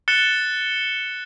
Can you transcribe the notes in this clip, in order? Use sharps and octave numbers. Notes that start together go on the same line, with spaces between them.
F#6 A6 C#7 E7 G7